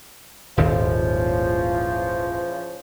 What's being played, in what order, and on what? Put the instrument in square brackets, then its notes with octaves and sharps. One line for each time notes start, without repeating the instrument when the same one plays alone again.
[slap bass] D#1 G#1 D#2 [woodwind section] C#3 E3 F3